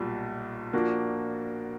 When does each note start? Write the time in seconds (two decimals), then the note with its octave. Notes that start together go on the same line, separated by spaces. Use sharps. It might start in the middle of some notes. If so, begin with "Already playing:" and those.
Already playing: B1 A#2 G3
0.73 A#2 F3 A#3 D4 F#4